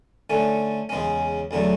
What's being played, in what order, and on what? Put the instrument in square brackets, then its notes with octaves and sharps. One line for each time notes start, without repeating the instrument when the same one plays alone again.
[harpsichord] D3 A3 C#4
E2 C#3 G#3 C#4
E2 D3 F#3 A3